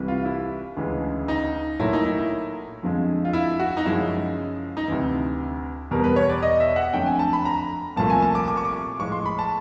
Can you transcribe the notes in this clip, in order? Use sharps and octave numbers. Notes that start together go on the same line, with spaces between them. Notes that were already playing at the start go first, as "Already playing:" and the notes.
Already playing: C2 C3 E3 G3
F4
E4
D2 C#3 E3 G#3
D#4
A#2 F#3 A3 E4
D#4
E4
E4
F2 D3 F3 G#3
F4
E4
F#4
D#4
F#2 C#3 F3 G#3 E4
D#4
D2 C3 E3 E4
E2 B2 G3 A#4
B4
C#5
D5
D#5
E5
F#5
F2 D3 F#3 A3 G5
G#5
A5
B5
A#5
C2 A#2 F3 A3 A5
G#5
A5
D6
D6
C#6
D6
A2 F3 G#3 C#6
C6
B5
A5